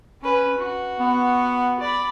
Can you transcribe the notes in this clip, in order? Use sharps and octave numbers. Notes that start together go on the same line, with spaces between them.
C#4 B4
F#4
B3
D5 B5